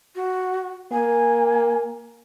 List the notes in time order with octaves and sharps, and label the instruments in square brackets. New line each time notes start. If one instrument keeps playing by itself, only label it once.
[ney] F#4
[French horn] A#3 [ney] G#5